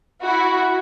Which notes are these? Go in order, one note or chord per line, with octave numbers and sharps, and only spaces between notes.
E4 F#4